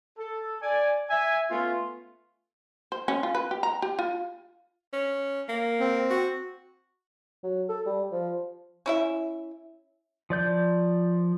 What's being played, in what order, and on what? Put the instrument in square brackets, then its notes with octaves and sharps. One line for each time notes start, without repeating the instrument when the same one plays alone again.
[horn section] A4
D5 G#5
E5 G#5
A3 B3 C#4 F4
[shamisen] C5
C#4
F4
B4
G4
A#5
G4
F4
[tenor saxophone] C#4
A#3
[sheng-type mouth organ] C4
[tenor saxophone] F#4
[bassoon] F#3
A4
G3
F3
[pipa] C#4 E4 E5
[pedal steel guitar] F3 D5 G6